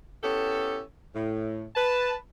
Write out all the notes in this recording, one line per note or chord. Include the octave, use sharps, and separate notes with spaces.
B3 C#4 E4 G4 A4
A2
B4 A5